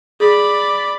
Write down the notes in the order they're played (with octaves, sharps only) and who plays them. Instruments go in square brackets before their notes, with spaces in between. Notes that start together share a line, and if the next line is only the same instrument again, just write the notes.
[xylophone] G#4 [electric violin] D5 B5